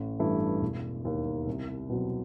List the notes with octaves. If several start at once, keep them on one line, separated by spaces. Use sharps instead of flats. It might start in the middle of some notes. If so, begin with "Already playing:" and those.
Already playing: A1
G2 E3 A3 E4
E1
D#2 D#3
C2
B2 F#3 C4